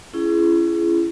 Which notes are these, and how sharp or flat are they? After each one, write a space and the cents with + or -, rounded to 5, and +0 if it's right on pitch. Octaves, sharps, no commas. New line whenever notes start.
C#4 +0 E4 +35 G#4 +15